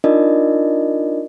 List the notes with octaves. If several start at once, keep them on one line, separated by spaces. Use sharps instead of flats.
D4 D#4 F4 A#4 D5 D#5